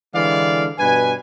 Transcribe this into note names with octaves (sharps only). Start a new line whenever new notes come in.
D3 E3 G#3 D5 F5
G2 B2 B4 G#5